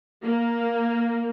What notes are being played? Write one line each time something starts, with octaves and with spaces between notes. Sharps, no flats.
A#3